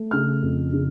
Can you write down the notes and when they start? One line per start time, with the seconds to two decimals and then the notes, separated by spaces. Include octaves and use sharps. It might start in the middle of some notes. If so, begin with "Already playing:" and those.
Already playing: A3
0.11 C#3 F6
0.42 F2
0.73 C#3